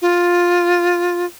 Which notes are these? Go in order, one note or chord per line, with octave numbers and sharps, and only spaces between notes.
F4